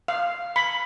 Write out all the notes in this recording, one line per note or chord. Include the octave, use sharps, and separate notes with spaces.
F5
B5